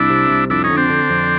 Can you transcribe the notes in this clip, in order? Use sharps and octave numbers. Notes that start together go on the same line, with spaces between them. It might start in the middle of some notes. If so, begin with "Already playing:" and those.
Already playing: C2 D4 E4
C3
C2
F2 D4 E4
C#4 D#4
D3
C4 D4
D3
F2